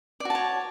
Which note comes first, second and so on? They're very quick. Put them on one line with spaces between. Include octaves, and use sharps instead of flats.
D5 F#4 A5 C#5